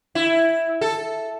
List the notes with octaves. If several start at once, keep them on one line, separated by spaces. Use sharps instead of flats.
E4
A4